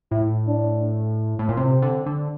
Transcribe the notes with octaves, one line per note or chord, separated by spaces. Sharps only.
A2 E4
D4
A2
A#2
C3 C4
D3
D3